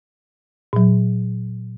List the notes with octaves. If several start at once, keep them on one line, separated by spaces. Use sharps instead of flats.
A#2 F#3